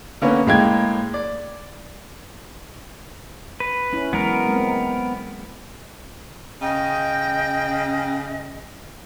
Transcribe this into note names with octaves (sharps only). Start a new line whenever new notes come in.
D3 A#3 B3 C#4
A2 G#3 A#3 G5 G#6
D5
B4
C#4 E4
E3 F#3 G#3 B3 A#4
G#3 A#3 C4
C#3 D#5 G5